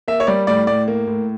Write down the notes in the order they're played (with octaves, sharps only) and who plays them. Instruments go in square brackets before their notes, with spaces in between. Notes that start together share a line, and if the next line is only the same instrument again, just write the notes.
[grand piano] A#3 E5
C#5
G3 D5
A2 D5
A2 D5
A#3
A2